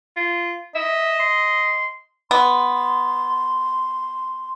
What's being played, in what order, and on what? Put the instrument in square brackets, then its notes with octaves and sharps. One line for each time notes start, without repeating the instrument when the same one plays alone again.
[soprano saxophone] F4
[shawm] D#5 [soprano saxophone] E5
[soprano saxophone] C6
[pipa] B3 [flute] C6